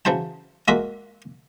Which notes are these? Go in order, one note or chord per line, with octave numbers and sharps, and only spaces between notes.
C#3 E3 F#3 C5 A5
G#3 A#3 F4 F#4 A#4 E5